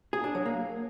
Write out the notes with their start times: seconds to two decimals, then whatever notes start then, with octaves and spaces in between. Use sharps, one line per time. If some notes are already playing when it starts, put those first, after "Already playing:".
0.13 G#4
0.24 D4
0.35 F#3
0.45 A#3